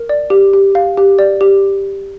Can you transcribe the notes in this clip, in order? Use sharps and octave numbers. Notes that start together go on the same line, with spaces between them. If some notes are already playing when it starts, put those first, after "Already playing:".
Already playing: A#4
D5
G4
G4
F5
G4
D5
G4